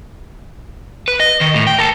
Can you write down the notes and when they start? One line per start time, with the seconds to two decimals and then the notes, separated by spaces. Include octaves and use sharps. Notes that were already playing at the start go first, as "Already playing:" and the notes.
1.08 B4
1.20 D#5
1.41 D#3
1.54 A2
1.67 G5
1.78 A#4 A5